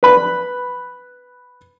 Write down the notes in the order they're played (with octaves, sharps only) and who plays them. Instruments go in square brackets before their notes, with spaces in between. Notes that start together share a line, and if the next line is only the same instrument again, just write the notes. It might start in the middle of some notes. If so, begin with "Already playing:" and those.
[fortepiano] B4 B5